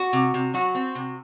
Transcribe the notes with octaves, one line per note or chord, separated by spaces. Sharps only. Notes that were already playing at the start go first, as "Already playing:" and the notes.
Already playing: F#4
C3
C3
F#3 F#4
C4
C3